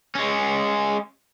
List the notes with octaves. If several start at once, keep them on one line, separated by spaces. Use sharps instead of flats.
G#3 C#4